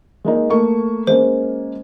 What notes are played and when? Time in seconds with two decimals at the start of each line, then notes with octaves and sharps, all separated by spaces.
0.25 G#3 A#3 D#4
0.50 A3 A#3 C#6
1.07 G#3 A#3 C#4 C5